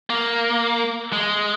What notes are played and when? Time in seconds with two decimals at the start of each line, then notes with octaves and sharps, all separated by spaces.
0.10 A#3
1.13 G#3